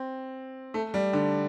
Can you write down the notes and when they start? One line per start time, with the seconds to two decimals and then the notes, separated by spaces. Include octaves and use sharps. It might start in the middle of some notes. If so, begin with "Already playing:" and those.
Already playing: C4
0.74 A3
0.94 G3
1.13 D3